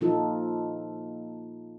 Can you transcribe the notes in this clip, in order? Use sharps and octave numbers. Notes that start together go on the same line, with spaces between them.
A#2 F3 D#4 F4 A4